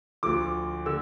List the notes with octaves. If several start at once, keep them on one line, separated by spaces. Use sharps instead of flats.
D2 D3 F3 D6
D3 E6